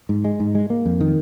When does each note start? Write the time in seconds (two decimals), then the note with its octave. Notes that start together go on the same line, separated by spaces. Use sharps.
0.09 G#2
0.24 G#3
0.40 G#2
0.55 G#3
0.70 A#3
0.85 F2
1.00 D#3